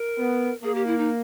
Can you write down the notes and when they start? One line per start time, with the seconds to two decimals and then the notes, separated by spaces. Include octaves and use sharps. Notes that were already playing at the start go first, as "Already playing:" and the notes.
Already playing: A#4
0.18 B3
0.63 A#3 G#4
0.75 G4
0.87 E4
0.98 D#4